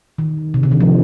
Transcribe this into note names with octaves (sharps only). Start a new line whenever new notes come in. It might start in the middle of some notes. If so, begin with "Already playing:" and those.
D#3
C3
D3
D#3
F3